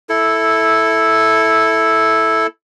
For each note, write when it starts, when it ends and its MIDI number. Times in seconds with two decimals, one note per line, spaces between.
0.09 2.47 64
0.09 2.47 69